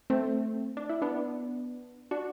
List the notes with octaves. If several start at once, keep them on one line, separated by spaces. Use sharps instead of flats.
A3 C4
D4
E4
B3 D4
D4 F#4